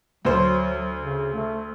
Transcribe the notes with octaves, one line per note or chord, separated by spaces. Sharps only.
D2 F#3 C5
C#3
A3